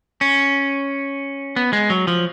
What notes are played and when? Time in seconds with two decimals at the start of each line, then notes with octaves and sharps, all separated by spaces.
0.21 C#4
1.56 B3
1.73 G#3
1.90 F#3
2.07 F3